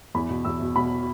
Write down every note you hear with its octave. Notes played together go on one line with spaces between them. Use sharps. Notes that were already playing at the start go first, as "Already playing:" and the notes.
E2 B5
B2
E2 E6
B2
B2 B5